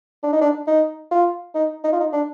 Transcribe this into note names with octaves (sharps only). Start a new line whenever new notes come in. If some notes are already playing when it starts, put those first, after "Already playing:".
D4
D#4
D4
D#4
F4
D#4
D#4
F4
D#4
D4